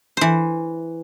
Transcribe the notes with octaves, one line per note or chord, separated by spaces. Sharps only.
E3 C5